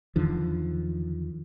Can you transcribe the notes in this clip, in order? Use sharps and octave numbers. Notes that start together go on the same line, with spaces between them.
E2 D3 D#3 F3